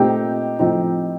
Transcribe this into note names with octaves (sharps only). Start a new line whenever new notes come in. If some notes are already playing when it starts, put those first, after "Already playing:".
Already playing: A#2 A3 C4 D#4 G4
A2 F3 C4 D#4